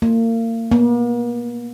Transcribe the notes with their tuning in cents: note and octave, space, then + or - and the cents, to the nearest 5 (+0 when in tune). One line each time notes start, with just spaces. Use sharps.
A#3 -35
A#3 +45